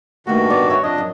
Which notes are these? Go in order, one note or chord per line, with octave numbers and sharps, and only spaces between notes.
G2 D#3 A3 A#3 F#4
B3 D5
C#5 E5
F2 D4 D#5
F#2